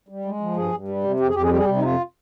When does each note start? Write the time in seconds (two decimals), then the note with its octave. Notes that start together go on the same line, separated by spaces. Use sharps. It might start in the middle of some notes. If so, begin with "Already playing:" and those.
0.09 G3
0.25 G#3
0.40 F3
0.56 G2 G#4
0.73 G2
0.88 G3
1.04 C3
1.20 F2 G4
1.27 G#4
1.35 F2 G4
1.43 G#4
1.50 G3 G4
1.57 G#4
1.64 G4
1.67 C3
1.77 D#4
1.83 F2 F4